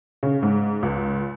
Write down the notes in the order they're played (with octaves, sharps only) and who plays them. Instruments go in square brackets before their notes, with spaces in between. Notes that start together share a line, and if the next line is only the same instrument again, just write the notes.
[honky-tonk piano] C#3
G#2
C#2